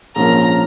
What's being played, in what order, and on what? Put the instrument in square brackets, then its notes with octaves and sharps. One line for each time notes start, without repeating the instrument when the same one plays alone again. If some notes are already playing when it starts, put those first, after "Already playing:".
[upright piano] A#1 G#2 F3 C#4 A#4 [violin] A#5